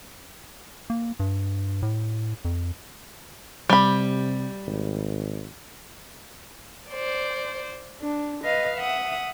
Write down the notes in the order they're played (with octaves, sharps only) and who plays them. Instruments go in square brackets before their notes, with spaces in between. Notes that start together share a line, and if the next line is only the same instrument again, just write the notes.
[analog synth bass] A#3
G2
A2
F2
[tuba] C3 [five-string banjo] G3 B5
[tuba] G#1
[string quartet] C5 D5
D4
B4 D#5 F5
E5 F#5 D#6